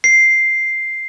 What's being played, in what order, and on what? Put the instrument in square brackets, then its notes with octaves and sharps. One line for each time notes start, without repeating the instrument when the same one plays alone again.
[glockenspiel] C7